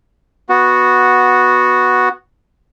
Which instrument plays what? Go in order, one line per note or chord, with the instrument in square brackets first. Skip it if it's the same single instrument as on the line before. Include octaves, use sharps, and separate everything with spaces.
[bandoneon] B3 F#4